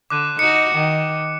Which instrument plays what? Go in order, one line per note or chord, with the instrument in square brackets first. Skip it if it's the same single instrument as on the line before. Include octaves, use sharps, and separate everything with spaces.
[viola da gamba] D3 [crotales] D6 F#6 D#7
[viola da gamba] D#4 F#4 [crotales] C#7
[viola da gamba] D#3